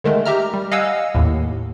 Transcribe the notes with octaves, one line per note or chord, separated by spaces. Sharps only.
D3 D#3 G#3 A3
G4 E5 A#5 F6
G3
D#5 F5 F#5 G#5 E6
D#2 A2